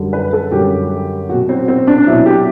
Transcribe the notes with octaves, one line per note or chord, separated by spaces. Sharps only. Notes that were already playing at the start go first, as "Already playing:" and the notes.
Already playing: F#2 D3 G3
B4
A4
F#2 D3 G3 G4
B2 F#3 F#4
C4
C4
D4
D4
B2 F#3 E4
G4